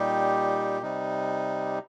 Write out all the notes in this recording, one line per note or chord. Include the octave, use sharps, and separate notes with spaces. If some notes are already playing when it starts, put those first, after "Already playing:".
Already playing: A#2 G3 D#4 G4
C3 G3 D#4